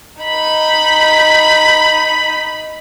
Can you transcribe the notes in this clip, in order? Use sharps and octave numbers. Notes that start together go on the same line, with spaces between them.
D#4 B5